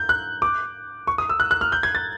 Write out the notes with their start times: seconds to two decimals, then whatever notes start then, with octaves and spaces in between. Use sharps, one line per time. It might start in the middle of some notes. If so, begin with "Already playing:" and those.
Already playing: G6
0.09 F#6
0.42 D6
1.07 C#6
1.18 D#6
1.29 E6
1.40 F#6
1.51 F#6
1.61 F6
1.72 G6
1.83 G#6
1.95 A6